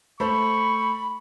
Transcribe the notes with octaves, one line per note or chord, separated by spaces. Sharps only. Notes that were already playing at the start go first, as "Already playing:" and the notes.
A3 C5 B5 C#6